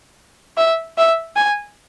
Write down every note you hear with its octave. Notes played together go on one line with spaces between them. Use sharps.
E5
E5
G#5